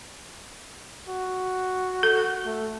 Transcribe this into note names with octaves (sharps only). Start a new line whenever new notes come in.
F#4
A4
A3